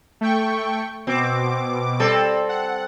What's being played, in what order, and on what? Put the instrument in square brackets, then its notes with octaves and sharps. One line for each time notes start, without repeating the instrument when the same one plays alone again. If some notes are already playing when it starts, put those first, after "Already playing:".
[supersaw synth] A3 G5 C#6
[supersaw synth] B2 D6 [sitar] C4
[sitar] G3 C4 A4
[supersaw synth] F#5